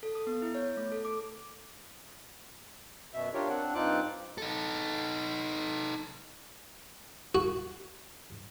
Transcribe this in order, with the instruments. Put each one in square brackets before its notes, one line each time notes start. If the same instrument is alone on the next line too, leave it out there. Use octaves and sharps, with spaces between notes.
[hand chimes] A4
D#6
B3
E4
C#5
A3
A4
D6
[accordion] F#2 B2 E5
D4 F4 G4 A#4 C#5
C4 D4 F#5
G2 C4 D#4 F4 D6 F#6
[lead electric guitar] D#4 A4
[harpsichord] F#4